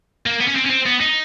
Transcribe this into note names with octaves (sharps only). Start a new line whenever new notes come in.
A#3
B3
C#4
C4
C#4
C4
B3
D#4